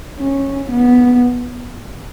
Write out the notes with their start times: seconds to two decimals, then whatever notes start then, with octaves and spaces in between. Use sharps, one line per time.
0.19 C#4
0.71 B3